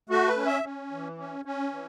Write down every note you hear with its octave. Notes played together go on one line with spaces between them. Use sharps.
A3 F#4
B4
C#4
E5
C#4
E3
C#4
C#4
E3